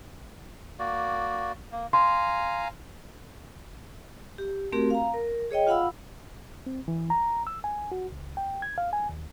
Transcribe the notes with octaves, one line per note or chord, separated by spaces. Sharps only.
A#3 F#4 D5
A#3
F5 G#5 A#5 C6
G4
A3 C4 F#4 G4 A#4
F5 A#5
A#4
G#4 C#5 D#5 G5
F4 F5 F#5 B5 E6
C4
E3
A#5
E6
G#5
F#4
C#2
G5
G#6
F5
G#5
D#2